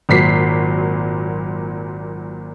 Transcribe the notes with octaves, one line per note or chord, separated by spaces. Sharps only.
G#1 A#2 F#3 B6 C7